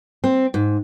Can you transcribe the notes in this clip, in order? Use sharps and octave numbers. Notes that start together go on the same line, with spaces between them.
C4
G#2